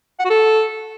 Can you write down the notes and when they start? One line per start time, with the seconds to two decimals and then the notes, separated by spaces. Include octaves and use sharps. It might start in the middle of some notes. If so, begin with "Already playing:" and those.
0.19 F#5
0.25 F#4
0.30 A4